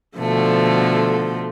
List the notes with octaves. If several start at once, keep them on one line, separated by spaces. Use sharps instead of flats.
B2 D3 F3 A3